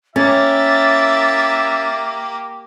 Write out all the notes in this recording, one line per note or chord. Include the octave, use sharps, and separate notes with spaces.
A#3 C#4 E4 G4 E5 A6